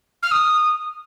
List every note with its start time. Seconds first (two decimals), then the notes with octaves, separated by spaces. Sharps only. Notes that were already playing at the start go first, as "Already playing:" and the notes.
0.23 F6
0.31 D#6